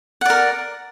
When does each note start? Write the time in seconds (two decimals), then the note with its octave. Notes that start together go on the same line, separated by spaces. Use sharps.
0.21 F#5
0.26 D5
0.30 A#4